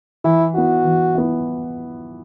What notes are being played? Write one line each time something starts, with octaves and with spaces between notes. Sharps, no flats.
E3 E4
B3 E4 F#4
E3
B3 E4